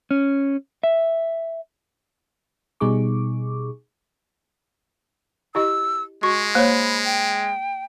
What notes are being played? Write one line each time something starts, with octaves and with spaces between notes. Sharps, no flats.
C#4
E5
B2 G3 D#4 G#4 C#6 D6
E4 G4 D#5 E6
G#3 F#4 D#5 C#6
A#3 C5 C#5 B5
G5